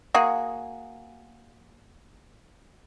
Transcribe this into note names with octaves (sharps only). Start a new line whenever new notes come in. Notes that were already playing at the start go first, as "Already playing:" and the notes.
A#3 F#4 G#4